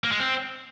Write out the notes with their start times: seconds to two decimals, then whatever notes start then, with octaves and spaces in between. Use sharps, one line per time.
0.04 A#3
0.12 G#3
0.19 C4